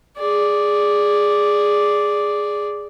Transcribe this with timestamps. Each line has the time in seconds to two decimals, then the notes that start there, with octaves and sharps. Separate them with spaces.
0.17 G#4 D5